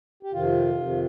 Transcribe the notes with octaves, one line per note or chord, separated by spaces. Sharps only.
G4
F2 C3 D#3 F4
F2 C3 D#3